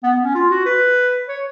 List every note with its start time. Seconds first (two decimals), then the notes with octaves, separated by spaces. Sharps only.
0.03 B3
0.14 B3
0.24 C#4
0.35 F4
0.50 F#4
0.66 B4
1.28 C#5